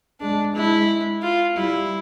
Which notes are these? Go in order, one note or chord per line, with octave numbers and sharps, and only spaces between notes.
G#3 D4
G#3 E4
F4
G3 E4